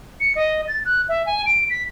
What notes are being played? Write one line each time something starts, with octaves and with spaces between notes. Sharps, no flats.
C#7
D#5
A6
F#6
E5
G#5
D7
B6